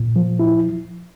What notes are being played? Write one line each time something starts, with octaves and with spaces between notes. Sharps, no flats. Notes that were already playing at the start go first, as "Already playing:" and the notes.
Already playing: A#2
F3
E4